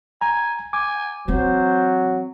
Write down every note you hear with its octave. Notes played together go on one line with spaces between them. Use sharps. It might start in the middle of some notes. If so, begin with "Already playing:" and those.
G#5 A#5
G#5 D6
E3 F#3 C4 C5